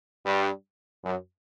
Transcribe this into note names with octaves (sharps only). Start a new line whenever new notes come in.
G2
F#2